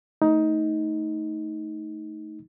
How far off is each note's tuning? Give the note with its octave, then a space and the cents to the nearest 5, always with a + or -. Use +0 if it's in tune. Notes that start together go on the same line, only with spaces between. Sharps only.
A3 +0 D#4 +15